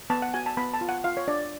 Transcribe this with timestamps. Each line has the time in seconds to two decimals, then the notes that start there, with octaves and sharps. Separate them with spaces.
0.10 B3 A5
0.22 F#5
0.34 F#4 G#5
0.46 A5
0.57 B3 B5
0.73 A5
0.81 F4
0.89 F#5
1.04 F4 F5
1.17 C#5
1.28 D4 D5